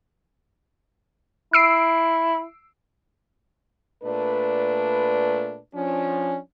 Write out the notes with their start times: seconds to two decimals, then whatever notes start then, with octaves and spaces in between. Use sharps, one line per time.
1.53 E4 E6 C7 D7
4.03 A#2 A3 D4 B4
5.75 F3 C#4 D4